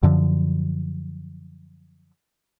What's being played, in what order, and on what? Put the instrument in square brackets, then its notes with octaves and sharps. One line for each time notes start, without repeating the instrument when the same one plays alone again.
[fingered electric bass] F#2 D3 F3